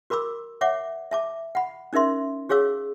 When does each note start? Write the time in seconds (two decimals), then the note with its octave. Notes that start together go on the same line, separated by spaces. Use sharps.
0.10 F#4 A#4 B5 D6 E6
0.61 C#5 E5 F#5 D6
1.11 E5 A5 D6
1.55 F#5 B5
1.93 C#4 D#4 A#4 E5 C6
2.49 F#4 G#4 C#5 F5 E6